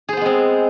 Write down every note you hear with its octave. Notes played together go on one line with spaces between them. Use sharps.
G#3 B3 C4 G#4 C5